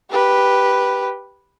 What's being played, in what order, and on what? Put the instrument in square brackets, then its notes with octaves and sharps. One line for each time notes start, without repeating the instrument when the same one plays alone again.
[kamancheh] G4 B4